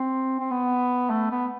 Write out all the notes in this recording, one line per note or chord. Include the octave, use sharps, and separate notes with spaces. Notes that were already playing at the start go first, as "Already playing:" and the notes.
Already playing: C4
C4
B3
A3
B3